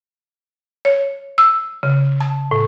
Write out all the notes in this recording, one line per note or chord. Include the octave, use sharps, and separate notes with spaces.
C#5
E6
C#3
A5
A2